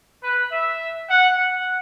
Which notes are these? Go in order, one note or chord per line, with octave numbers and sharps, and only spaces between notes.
B4
E5
F#5
F#5